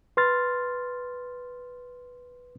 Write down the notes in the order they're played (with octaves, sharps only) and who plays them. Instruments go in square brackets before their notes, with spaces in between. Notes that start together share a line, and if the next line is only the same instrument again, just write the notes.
[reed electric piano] B4 C6 F6 A6